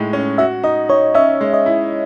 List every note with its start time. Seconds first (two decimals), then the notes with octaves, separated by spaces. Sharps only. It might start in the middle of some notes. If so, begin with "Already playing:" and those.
Already playing: A2 G#3 D#4
0.13 C#4
0.38 F#4 E5
0.64 D#4 D#5
0.89 D#4 C#5
1.15 C#4 E5
1.41 G#3
1.54 D#5
1.66 E4